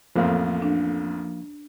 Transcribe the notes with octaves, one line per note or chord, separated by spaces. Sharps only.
A1 F2 F3 A#3 F5
D4